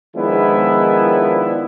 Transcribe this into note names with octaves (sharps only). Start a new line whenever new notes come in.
D#3 F3 G#3 B3 D4 E4